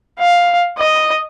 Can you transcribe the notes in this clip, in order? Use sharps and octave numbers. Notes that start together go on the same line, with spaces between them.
F5
D#5